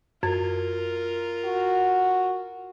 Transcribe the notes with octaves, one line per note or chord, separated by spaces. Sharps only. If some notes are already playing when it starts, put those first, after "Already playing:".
F#2 F4 A#4 G#6
F#4